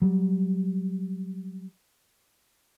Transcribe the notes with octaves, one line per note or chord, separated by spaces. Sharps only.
F#3 G3